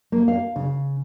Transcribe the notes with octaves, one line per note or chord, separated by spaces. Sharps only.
A#3
F5
C#3